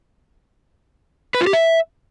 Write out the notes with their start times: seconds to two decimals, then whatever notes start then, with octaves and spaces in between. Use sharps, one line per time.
1.35 B4
1.41 F4
1.47 G4
1.53 E5